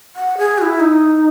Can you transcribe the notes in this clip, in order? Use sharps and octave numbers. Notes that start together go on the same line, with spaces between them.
F#5
G#4
F#4
E4
D#4